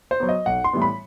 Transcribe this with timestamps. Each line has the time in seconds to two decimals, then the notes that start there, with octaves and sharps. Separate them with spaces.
0.11 C5
0.20 F#3 B3
0.29 D#5
0.46 B1 F#5
0.64 C6
0.73 A2 E3 G3 B3
0.82 B5